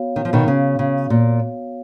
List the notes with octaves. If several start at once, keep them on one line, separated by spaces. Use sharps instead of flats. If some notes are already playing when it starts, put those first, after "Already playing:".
Already playing: B3 F#4 C#5 F5
D#3
F3
B2 D#3
C#3
C#3
A#2